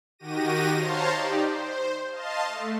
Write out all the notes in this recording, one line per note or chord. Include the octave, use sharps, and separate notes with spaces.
D#3 F#4 G4 A#6 D#7
C5 C#5 F5 A5 A#5 C6
D#4 G4 D5
C5
D#5 F5 A5 C6
A3